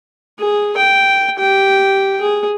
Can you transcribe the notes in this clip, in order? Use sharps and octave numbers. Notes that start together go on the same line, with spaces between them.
G#4
G5
G4 G5
G#4